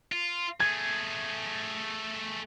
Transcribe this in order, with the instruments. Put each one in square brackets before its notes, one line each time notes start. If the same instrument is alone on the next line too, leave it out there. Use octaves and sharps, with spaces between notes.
[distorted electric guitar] F4
[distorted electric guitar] A3 G#4 [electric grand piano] G#6